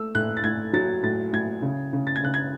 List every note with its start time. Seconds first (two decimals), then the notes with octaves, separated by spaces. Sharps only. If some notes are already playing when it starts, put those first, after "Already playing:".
Already playing: A3 E6
0.15 A2 F#6
0.37 A6
0.44 A2 G#6
0.73 F#3 A6
1.03 A2 A6
1.33 A2 G#6
1.62 C#3
1.93 C#3
2.07 A6
2.16 G#6
2.22 C#3 F#6
2.34 G#6